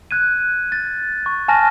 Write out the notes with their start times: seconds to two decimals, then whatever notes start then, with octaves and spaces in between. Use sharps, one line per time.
0.11 F#6 G#6 D#7
0.72 A6
1.26 C#6
1.48 G#5 A5 F6 A#6